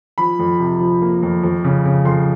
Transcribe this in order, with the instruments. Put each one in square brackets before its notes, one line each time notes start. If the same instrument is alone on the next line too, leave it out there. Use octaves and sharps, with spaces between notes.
[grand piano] F3 B5
F2
C3
F3
A#3
F2
F2
C#3
C#3
F2 C6